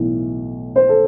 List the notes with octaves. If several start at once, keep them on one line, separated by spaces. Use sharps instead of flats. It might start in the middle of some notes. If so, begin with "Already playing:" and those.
Already playing: B1 A2 E3
C5
A4